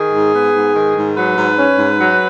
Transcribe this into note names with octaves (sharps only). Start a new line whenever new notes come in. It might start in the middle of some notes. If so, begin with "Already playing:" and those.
Already playing: D#3 G#4
G#2
B3
G#2
D#3
G#2
F#3 B4
G#2
C#4
G#2
F#3